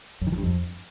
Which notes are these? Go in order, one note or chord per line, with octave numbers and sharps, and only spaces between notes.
F#2
D#3
F3
G2
F2